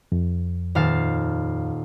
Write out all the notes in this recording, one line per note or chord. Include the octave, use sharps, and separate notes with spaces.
F2
D#1 F5 A5